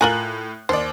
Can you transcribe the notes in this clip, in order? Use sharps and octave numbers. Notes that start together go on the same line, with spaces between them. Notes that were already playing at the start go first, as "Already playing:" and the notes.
A2 F4 A#4 G#5 F#6 F#7
D#2 C5 D5